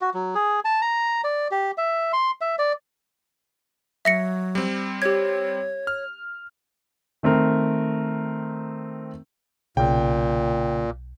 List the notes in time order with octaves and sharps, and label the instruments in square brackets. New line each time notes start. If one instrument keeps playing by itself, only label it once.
[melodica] F#4
F#3
G#4
A5
A#5
D5
G4
E5
C6
E5
D5
[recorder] F#3 [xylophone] E5 A#6 C#7
[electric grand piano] G3 C4
[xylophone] G4 G#6 [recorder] C#5
[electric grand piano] F6
[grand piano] D#3 A3 C4 A#4
[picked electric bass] B1 [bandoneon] A#2 [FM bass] C#3 [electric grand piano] G5